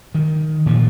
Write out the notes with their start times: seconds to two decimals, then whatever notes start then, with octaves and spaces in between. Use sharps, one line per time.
0.15 D#3
0.66 A#2 E3 F3